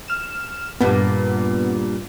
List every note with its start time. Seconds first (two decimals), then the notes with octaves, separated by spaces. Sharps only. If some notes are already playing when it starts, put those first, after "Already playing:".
0.08 F6 E7
0.81 G2 A#2 B3